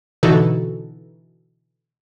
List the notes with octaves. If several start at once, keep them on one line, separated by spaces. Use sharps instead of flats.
B2 D3 E3 D#4 F#4 A4